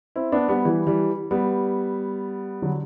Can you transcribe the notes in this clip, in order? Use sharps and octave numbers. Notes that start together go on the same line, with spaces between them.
C4 E4
B3 D4
G3 B3
E3 G3
E3 G3
G3 B3
D3 F#3